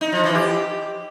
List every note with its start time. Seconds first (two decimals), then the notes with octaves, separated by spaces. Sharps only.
0.01 D#4
0.12 F3
0.24 E3
0.35 G4